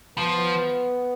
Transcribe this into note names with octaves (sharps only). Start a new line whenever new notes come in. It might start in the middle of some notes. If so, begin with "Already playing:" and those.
F3 B3 B4